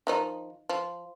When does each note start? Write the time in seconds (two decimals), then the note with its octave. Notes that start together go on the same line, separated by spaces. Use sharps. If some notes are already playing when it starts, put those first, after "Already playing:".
0.07 D#3 F3 D#4
0.69 F3